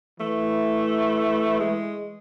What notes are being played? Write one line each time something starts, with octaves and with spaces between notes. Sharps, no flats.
E3 A3
G#3